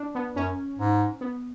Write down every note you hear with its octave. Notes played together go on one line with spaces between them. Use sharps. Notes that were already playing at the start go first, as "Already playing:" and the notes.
Already playing: D4
B3
F#2 C#4
G#2
B3